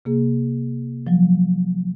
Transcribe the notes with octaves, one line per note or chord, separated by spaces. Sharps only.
C3 A#3 G#4
F3 F#3